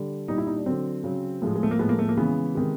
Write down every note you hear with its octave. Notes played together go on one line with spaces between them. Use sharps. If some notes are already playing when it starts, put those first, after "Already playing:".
Already playing: D3 G3
A#2 G3 D#4
E4
D#4
D4
D3 F#3 C4
C#3 F#3
A2 F3 G#3
G#3
A3
A#3
A2 F3 G#3 B3
A#3
A3
A#3
C#3 E3 G#3 B3
C3 D#3 G#3